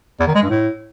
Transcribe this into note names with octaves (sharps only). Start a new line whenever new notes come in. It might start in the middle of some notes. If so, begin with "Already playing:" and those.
E2
D#3
G#3
G2
A2